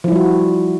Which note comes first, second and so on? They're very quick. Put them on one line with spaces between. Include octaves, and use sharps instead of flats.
F3 E4 G3 F#4